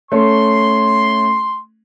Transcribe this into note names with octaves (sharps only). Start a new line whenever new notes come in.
A3 C#4 C6